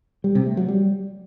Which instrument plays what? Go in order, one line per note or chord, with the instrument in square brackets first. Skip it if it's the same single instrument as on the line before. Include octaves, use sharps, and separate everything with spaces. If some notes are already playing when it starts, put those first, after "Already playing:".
[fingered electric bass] G3
C3
A3
F#3
G3